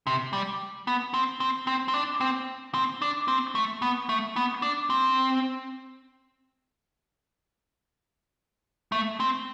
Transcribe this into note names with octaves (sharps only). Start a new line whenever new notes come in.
C3
G3
B3
C4
C4
C4
C4
D4
C4
C4
D4
C4
A3
B3
A3
B3
D4
C4
A3
C4